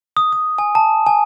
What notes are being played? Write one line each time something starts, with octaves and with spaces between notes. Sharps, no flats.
D#6
D#6
G#5
A5
G#5